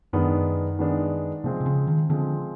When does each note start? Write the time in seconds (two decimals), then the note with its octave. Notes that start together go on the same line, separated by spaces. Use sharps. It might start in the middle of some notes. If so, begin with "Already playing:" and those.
0.13 F#2 D#3 G#3 B3 D4
0.79 D#3 G#3 B3 D4
1.44 C3 F3 G#3 C4
1.60 C3
1.66 C#3
1.87 D#3
2.10 D3 F3 G#3 C4